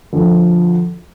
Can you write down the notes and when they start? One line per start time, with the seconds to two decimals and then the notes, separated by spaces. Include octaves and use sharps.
0.13 D2 F3